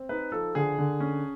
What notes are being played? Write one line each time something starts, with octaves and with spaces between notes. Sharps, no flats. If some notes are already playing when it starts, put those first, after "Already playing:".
Already playing: C4
D#4 B4
F3 A4
D3 G#4
D3
C#4